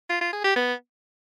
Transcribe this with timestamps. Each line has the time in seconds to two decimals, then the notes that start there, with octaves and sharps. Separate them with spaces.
0.09 F4
0.21 F4
0.33 G#4
0.44 G4
0.56 B3